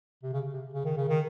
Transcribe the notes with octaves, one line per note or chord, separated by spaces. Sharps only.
C3
C#3
C3
C#3
D#3
C#3
D#3